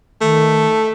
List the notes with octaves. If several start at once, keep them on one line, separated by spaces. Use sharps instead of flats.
D#3 A3